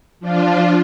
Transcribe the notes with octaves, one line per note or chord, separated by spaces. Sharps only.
F3 D4 F4